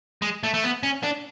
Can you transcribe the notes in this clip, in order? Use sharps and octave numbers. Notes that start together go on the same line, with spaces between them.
G#3
A3
A3
B3
C#4
D4